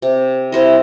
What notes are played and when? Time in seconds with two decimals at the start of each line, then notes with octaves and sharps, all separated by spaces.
0.02 C3
0.52 C3 E4 C5 D#5